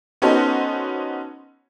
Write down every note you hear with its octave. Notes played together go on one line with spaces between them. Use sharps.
B3 C#4 D#4 F#4 A4 C5